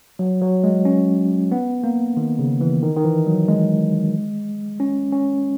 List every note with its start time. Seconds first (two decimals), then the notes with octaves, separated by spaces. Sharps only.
0.19 F#3
0.42 F#3
0.64 G#3
0.85 C#4
1.52 B3
1.84 A#3
2.17 D#3
2.39 C#3
2.61 E3
2.83 D#3
2.97 D#3
3.04 E3
3.27 F#3
3.48 G#3
4.80 C#4
5.12 C#4